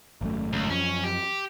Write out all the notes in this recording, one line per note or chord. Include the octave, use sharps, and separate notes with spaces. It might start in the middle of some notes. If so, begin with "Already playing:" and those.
G#1 F#2 A3
C#2
F#2 F3 C#4
G4